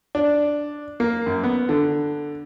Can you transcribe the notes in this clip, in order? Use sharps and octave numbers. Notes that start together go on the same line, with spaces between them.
D4
A#3
F#2
B3
D3